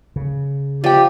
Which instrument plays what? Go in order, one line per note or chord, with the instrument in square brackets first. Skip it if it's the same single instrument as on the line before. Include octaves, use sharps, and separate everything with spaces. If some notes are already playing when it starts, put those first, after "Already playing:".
[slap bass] C#3
[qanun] F3 [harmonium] G4 [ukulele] D5 G5